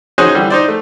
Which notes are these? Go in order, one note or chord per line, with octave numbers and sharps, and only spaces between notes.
C#4 D#4 F#4 G#4 C5 C#5
D3 E3 G3
D#4 C5 D5
A3